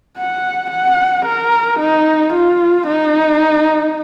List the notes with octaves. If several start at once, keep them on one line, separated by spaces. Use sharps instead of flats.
F#5
F#5
A#4
D#4
F4
D#4